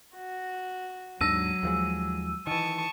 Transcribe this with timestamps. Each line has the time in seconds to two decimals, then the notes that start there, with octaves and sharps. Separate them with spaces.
0.15 F#4
1.21 D#2 G#2 F#3 D4 E6 D#7
1.63 D#2 F3 G#3
2.47 D#3 E3 A5 C#6 D#6